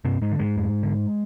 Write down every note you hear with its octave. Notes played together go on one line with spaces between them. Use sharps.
G2 C3 C4
G#2 G#3
D3
G#2 G#3
F2
D3